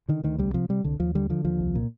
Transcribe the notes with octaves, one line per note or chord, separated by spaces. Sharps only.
D3 D#3
D2 D#3
C2 G3
C3 F3
C3 G3
C2 D3
D#2 F3
D3 G3
D3 F3
D#2 F3
C2
A#2